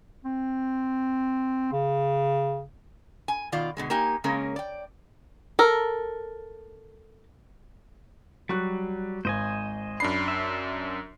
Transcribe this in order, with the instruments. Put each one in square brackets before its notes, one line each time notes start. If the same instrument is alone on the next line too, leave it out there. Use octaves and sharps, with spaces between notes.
[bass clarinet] C4
C#3
[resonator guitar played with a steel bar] G#5
B2 D#3 F4 D5
B2 D3 G#3
A#3 D#4 G4 G#5
C#3 G#3 A#3 C#4 A#4
D5 G5
[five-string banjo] A4 A#4
[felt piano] F#3 C#6 F#6 [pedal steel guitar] G3
[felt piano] G#1 [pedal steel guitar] C5 D#5 G#5
[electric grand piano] F#2 D4 C7 [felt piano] B5
[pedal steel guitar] E5